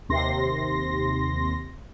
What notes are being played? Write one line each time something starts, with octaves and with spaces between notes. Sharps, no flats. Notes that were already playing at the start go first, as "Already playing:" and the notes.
D#2 C3 C6 A#6